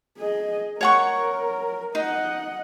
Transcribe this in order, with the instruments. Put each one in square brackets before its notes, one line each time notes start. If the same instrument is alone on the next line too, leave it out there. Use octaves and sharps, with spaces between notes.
[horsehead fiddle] G#4 D#5
[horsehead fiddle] A#4 [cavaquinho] C#5 F#5 C#6
[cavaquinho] D#4 [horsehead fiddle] D#5 F#5